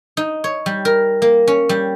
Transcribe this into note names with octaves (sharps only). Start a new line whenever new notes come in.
D#4
C#5
G3
A#4
A#3
C#4
G3